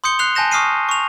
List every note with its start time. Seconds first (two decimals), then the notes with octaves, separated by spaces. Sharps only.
0.04 C6 D#6 G6 C#7 G7
0.19 F#6 C7 F7 G7
0.35 G#5 A5 G6 A#6 E7
0.51 C#6 D#6 F6 C7 D#7
0.89 C#6 F7